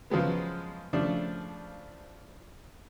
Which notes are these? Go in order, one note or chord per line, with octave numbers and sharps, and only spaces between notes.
C#3 F3 F#3 G#3 B3
C#3 F3 A3 D4